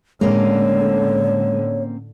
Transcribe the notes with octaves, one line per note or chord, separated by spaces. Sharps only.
A2 D3 G#3 A#3 C4 C#4 C#5